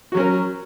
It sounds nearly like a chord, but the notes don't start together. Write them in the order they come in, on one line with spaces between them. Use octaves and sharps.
F#4 F#3 C#4 A#4